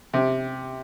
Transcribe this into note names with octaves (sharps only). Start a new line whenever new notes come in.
C3